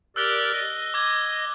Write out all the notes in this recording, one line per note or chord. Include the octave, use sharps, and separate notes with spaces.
G4 A#4 D5 E6 F#6 G7
D#5
D6 G#6